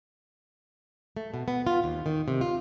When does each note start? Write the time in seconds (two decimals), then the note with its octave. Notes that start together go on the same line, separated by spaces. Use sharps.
1.17 A3
1.34 B2
1.48 B3
1.67 F4
1.84 D#2
2.06 D#3
2.28 C3
2.41 F4